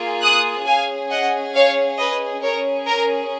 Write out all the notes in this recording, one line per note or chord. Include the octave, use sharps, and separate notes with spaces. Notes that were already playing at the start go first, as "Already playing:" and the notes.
Already playing: A#3 F4 G#4
D#6 F#6
C#4 G#4 F5 G#5
D#5 F#5
C#5 F5
B4 D#5
C#4 G#4 A#4 C#5
A#4